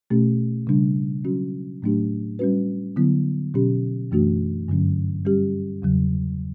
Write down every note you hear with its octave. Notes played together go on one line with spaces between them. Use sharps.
B2 A3 C#4 G4
C#3 G3 D4
F#3 C#4 F#4
A2 F#3 A3 D4 G4
G3 C#4 F#4 B4
D3 F#3 B3 E4
B2 F#3 C#4 G4
F#2 E3 A3 D4 F#4
G2 D3 F#3 C#4
G3 C#4 G4
E2 C#3 F#3